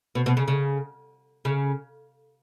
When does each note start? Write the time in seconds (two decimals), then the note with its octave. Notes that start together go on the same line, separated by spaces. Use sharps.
0.15 B2
0.26 B2
0.37 C#3
0.48 C#3
1.45 C#3